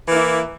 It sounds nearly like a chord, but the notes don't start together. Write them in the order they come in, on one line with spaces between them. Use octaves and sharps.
E3 A#3 E4